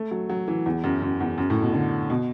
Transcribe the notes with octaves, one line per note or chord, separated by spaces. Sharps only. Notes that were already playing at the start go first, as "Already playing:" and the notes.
Already playing: A3
F#3
F#3
E3
E2
F#2
F#2
E2
F#2
A2
B2
D3
B2